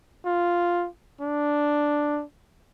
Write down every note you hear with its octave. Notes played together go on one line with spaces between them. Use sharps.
F4
D4